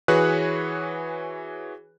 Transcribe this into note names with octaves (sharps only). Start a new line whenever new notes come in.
E3 F#4 G#4 B4 C#5 F#6